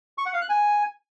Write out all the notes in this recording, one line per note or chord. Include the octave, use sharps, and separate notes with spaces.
C#6
F#5
F5
F#6
G#5